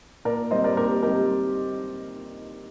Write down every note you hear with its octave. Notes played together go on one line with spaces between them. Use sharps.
A#2 A#4 D5
G3 C4 D#4 C5 D#5
A#4 D5
A#2 G4 A#4
G3 C4 D#4 G4 A#4